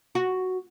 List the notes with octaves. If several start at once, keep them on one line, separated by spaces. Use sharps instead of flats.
F#4